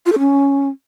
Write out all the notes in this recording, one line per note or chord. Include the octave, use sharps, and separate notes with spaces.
F4
A4
C#4